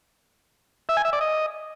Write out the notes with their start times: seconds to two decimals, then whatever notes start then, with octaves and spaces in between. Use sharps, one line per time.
0.89 E5
0.97 G#5
1.05 E5
1.13 D5
1.21 D#5